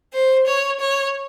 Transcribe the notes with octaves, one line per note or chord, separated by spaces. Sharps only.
C5
C#5
C#5